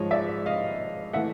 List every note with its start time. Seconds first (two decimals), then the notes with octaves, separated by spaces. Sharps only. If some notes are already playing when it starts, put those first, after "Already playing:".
Already playing: G#2 F3 G#3 C#5 D#5
0.11 D5 E5
0.46 D#5 F5
1.13 E3 A3 E5 F#5